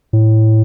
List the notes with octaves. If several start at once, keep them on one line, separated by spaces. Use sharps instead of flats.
A2